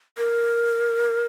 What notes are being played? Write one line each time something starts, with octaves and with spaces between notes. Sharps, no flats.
A#4